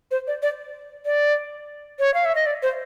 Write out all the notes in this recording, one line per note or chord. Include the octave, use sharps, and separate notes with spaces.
C5
D5
D5
D5
C#5
F5
E5
D#5
D5
C5